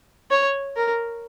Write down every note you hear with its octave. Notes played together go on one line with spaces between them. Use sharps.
C#5
A#4